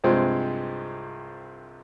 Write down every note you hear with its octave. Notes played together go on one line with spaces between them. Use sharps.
C2 G2 F3 G#3 C4